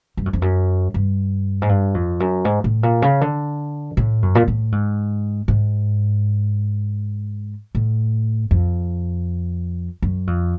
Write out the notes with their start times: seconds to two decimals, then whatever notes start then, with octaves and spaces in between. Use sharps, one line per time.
0.17 G2
0.26 F#2
0.33 F2
0.42 F#2
0.94 G2
1.62 G#2
1.69 G2
1.94 F2
2.20 F#2
2.45 G#2
2.64 A2
2.83 A#2
3.02 C#3
3.21 D3
3.97 A2
4.22 F#2
4.35 A#2
4.48 A2
4.72 G#2
5.48 G#2
7.75 A2
8.51 F2
10.02 F#2
10.27 F2